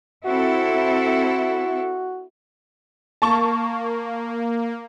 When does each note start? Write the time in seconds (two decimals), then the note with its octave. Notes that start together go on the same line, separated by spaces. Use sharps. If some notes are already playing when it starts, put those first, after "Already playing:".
0.25 C4 E4 F#4 A4
3.22 A#3 A5 C#6